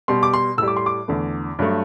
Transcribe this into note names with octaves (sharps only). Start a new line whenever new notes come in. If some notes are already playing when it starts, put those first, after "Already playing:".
B2 G3 C6
D6
C6
A2 G3 E6
D6
C6
D6
E2 D3 A3
G2 F#3 A3